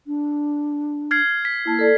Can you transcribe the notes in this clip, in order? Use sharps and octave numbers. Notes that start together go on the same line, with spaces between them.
D4
F6 G#6 C7
B6
A#3 E4 A5
A4 D5